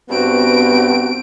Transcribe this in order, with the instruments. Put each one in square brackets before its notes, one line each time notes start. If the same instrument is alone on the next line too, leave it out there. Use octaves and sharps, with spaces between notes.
[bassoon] G2 [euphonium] B3 [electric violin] C4 D7 [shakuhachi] F#4